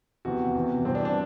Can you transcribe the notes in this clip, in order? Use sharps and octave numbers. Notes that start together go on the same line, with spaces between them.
E2 C3 E3 F#4
E2 C3 E3
G2 E3 C4
D4
D4